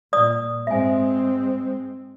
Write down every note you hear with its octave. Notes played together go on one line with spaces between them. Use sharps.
A#2 D5 D#6
G#2 G#3 C4 E5 G#5